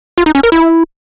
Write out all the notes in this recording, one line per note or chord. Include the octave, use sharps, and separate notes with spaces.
F4
D#4
C#4
A#4
E4